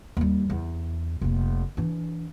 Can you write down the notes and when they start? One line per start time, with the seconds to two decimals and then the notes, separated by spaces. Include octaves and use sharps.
0.17 D#2 G3
0.50 E2
1.21 F1 A#3
1.77 E3 D4